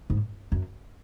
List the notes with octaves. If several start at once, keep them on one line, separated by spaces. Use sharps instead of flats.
G#2
F#2